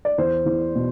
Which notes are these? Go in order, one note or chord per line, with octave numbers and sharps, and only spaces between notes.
D5
E2 C5
E2
B2